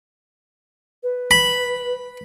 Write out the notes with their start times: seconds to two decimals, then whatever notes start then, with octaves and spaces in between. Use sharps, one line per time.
1.03 B4
1.31 B5